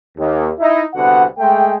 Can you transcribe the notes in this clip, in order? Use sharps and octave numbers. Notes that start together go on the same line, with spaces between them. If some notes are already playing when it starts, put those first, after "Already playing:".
D#2
D#4 E4
C2 D3 B3 F#4 F#5
G#3 A3 G5